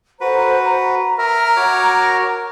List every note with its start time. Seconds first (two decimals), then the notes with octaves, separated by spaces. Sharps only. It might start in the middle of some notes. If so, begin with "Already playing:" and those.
0.21 F#4 A4 B4 C5 A#5
0.65 A#5
1.19 A#4 E5
1.57 F#4 C#5 D6